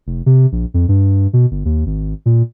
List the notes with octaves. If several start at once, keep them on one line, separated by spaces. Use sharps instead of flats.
F1
C3
A#1
F2
G2
B2
G1
D#2
G#1
A#2